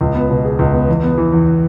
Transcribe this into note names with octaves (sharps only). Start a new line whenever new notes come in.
C#2
B3
B2
G#4
C#2
B3
E2
B3
E3
E2